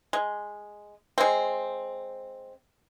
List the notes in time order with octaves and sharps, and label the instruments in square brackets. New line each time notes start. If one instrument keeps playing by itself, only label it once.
[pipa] G#3
G#3 C4